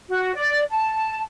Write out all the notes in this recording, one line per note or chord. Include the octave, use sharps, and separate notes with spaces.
F#4
D5
A5